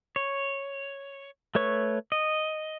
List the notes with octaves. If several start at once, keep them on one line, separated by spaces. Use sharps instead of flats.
C#5
A3 B4 C#5 C#6
D#5